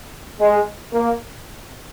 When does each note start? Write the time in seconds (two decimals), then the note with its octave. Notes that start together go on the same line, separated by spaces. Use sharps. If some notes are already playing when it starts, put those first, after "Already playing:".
0.40 G#3
0.94 A#3